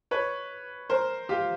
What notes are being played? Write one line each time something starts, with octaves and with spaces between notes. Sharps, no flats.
B4 C#5
A#4 C5
F4 G4